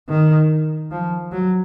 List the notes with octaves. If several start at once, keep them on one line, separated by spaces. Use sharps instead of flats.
D#3
F3
F#3